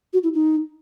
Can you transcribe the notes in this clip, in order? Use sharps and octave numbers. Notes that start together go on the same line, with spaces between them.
F#4
E4
D#4